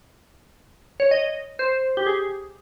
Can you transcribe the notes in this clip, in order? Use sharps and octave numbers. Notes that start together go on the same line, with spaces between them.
C#5
D#5
C5
G4
G#4